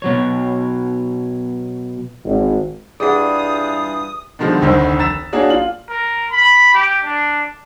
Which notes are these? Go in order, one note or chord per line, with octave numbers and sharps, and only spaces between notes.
B2 F#3 C#5
G#1
G2 E3 G3 F4 G#4 F#5 D#6
B2 D3 D#3 F3 G3 G#3
F1 D2 D#3 C5 E6
A#5 E6 A6 B6 E7
A#3 C#4 D4 F#4 G#4
F4 F#7
A#4
B5
G4
D4